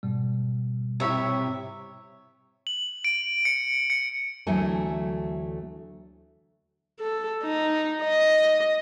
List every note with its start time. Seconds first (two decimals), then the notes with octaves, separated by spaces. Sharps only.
0.03 G#2 B2 G3
1.00 C3 E4 C#5 E5
2.67 F#7
3.04 D7
3.45 C#7
3.90 C#7
4.47 D2 E3 F#3 A3 G#5
7.00 A4
7.43 D#4
8.04 D#5